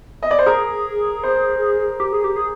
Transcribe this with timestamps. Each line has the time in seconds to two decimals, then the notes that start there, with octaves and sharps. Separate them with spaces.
0.23 D#5
0.31 D5
0.39 C5
0.46 G#4 A#4
1.23 C5
2.00 G4
2.13 G#4
2.24 G4
2.36 G#4